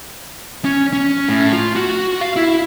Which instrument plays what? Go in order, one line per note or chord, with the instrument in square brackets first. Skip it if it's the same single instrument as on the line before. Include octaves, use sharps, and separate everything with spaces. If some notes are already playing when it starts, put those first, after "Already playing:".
[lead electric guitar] C#4
C#4
A2
F4
F#4
F5
E4